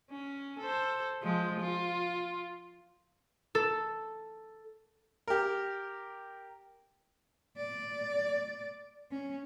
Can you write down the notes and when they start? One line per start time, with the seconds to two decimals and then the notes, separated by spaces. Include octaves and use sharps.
0.11 C#4
0.60 A4 C5
1.23 F3 G#3
1.60 F4
3.55 A4
5.28 G4 A#4
7.58 D5
9.11 C#4